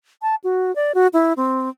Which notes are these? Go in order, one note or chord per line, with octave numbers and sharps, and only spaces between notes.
A5
F#4
D5
F#4
E4
C4